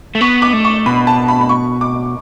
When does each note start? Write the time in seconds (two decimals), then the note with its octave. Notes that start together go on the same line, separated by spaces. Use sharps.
0.15 A3
0.21 B3 C#6
0.42 D6
0.53 A3
0.65 C#6
0.86 B2 B5
1.07 A5
1.28 B5
1.41 B5
1.49 C#6
1.81 D6